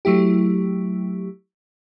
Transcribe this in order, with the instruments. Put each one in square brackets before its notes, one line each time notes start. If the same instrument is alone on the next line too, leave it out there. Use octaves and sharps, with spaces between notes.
[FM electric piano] F#3 A3 E4 G4